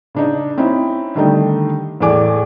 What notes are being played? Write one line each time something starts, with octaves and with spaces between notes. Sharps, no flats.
C#3 D4 D#4
C4 C#4 D#4 E4
D3 D#3 G3 A3 D4 D#4
E2 A2 A3 D5 G#5 D6